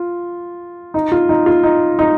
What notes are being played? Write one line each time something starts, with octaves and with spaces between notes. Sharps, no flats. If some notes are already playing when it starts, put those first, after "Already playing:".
Already playing: F4
D#4
F4
D#4
F4
D#4
D#4